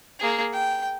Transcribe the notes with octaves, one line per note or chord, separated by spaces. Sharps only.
A#3 G#4
G5